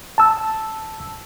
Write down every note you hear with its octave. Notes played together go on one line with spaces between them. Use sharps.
A5 E6